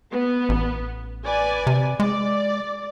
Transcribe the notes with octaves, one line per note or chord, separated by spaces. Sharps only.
B3
A1
B4 D5 G#5
C3
G#3 D5